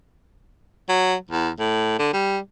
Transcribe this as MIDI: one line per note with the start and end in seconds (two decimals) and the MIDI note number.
0.89 1.15 54
1.31 1.49 40
1.59 1.95 45
1.99 2.09 50
2.13 2.38 55